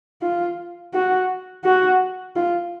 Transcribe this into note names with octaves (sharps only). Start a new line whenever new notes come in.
F4
F#4
F#4
F4